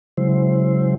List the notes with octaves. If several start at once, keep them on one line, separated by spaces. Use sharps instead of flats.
C#3 F#3 G#3 E4 C5